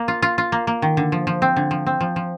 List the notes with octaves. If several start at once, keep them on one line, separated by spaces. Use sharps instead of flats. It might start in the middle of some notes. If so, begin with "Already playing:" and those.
Already playing: A#3
F4
F4
F4
A#3
A#3
D#3
D3
F3
F3
C4
D3
F3
C4
F3
F3